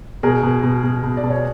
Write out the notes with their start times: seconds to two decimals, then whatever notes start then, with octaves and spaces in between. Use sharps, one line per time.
0.23 B2 G#4 A#4
0.43 B2
0.63 B2
0.83 B2
1.03 B2
1.17 D5
1.24 B2
1.30 C#5